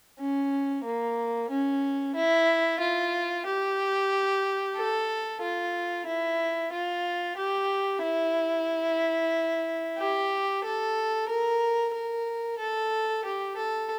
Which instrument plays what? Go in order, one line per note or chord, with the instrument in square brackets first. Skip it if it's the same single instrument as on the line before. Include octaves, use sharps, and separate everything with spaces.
[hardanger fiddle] C#4
A#3
C#4
E4
F4
G4
A4
F4
E4
F4
G4
E4
G4
A4
A#4
A#4
A4
G4
A4